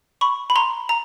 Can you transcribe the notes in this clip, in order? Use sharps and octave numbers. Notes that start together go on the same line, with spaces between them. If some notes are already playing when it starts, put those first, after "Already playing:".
B5 C#6
B5
A#5 C6
A#5